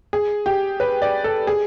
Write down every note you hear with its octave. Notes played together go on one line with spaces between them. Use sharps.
G#4
G4
B4
D5
A4
G#4